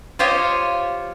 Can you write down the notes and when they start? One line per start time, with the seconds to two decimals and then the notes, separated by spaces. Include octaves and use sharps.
0.19 F4 G4 C5 C#5 D#5